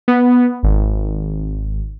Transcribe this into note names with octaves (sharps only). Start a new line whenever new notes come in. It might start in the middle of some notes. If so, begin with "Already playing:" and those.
B3
G#1